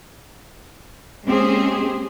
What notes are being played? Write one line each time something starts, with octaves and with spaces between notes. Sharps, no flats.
G#3 A#3 C4 C#4 G4 G#4